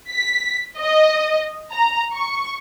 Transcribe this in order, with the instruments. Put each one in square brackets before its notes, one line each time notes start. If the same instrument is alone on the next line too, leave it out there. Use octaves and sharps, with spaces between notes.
[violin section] B6
D#5
A#5
C#6